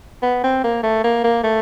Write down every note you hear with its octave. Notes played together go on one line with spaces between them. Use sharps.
B3
C4
A#3
A3
A#3
A#3
A3